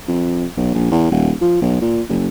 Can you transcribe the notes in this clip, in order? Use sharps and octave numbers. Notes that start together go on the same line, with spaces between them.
F2
B1
A#1
E2
D#1
F3
B1
A#2
F#1